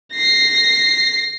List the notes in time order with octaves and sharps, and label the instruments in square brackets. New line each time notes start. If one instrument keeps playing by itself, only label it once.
[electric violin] A#6 C7